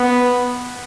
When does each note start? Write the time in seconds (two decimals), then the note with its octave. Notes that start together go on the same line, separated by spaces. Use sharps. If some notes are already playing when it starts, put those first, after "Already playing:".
Already playing: B3